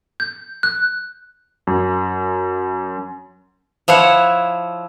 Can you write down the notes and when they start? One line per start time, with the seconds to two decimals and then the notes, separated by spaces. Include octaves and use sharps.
0.20 G6
0.63 F#6
1.67 F#2
3.88 F3 E4 C#5 F#5